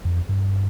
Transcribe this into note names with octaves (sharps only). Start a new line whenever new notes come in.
F2
G2